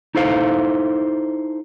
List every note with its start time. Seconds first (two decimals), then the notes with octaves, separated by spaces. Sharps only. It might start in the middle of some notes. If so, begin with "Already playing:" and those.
0.15 D#4 E4 A4 C5 F5